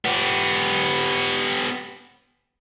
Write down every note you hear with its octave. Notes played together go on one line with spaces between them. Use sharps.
B3 G4